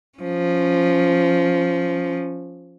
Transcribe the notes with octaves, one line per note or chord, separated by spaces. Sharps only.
F3 C#4